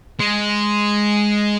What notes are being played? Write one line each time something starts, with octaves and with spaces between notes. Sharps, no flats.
G#3